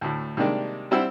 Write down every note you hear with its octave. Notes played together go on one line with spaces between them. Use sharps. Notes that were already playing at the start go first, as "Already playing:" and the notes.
D2 A2
C3 D#3 G3 G#3 A#3 D4
G3 C4 E4 C5 F#5 E6